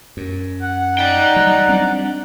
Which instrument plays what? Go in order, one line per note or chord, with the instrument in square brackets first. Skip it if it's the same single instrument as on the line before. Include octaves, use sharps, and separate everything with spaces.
[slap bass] F#2
[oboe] F#5
[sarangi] D#4 [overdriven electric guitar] D5 G5
[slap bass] F#3 G3
G3 C4 D4